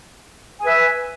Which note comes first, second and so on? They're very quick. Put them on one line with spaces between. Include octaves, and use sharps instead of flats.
G#5 B4 E5